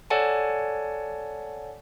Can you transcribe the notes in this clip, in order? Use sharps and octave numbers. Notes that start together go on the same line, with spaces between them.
A4 C#5 D5 F#5 G#5 A5